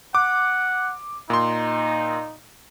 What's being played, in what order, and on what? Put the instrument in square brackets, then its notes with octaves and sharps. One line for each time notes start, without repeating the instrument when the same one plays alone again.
[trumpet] F#5 [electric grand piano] D6
[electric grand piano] A#2 C6 [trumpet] D#4